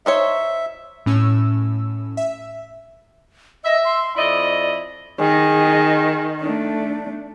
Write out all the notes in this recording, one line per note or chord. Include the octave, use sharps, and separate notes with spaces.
D#4 C5 C#5 E5
A2 C#4 E6
E5
D#5 E5
C6
F2 E4 D5 D#5
D#3 G#4 D#5
A3 D4